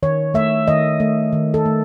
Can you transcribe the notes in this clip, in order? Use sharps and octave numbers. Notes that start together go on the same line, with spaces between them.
D#3 C#5
A3 E5
D#3 D#5
A3
D#3
A4
A3